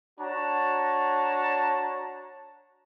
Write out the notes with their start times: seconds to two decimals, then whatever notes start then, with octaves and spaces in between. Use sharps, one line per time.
0.19 D4 F#4 C#5 A5 A#5